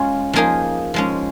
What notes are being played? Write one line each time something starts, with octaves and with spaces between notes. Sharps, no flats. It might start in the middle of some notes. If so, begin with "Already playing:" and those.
Already playing: G#3 C#4 F4
F3 A#3 D#4 G#4
F3 G#3 C#4